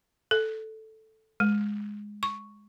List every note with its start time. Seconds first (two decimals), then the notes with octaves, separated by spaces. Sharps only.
0.31 A4
1.40 G#3
2.23 C#6